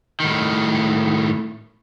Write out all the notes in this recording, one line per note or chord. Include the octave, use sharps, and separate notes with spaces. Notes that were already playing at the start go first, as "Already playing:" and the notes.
A2 D#3